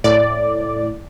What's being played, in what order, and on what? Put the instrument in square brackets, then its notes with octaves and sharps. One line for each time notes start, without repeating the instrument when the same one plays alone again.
[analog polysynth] A2 D5